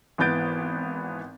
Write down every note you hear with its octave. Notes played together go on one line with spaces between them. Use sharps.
G#1 E3 B3 G6 A6 D7